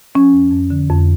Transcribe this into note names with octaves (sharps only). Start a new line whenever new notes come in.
F3 C#4
F2
F2
D3
F2